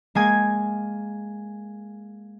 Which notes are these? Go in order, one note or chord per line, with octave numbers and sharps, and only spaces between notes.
G#3 A#3 G#5 G#6